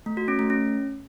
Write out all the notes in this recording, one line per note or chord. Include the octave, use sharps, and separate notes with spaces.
A3
F#4
C#4
A3
C#4